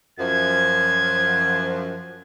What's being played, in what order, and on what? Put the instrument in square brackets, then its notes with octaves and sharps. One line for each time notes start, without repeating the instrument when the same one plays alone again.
[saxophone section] F#2 F3 [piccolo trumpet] G#6